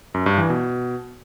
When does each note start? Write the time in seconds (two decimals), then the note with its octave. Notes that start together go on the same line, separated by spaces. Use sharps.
0.14 F#2
0.26 G2
0.38 E3
0.49 B2